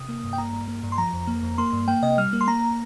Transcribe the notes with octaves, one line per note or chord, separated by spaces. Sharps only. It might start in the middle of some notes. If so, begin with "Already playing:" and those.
Already playing: C3 D#6
A#3
G2
G5
A#3 A#5
G2
A#3
G2
C6
F3 A#5
F2
A#3
F2
A#3 C6
G2
A#3 G5
C3 D#5
G3 F6
A#3
C6
A#3 A#5